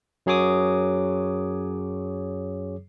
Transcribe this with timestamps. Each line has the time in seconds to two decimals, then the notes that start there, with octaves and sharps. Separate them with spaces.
0.26 F#2 F#3 G#4 C#5 D6 D#6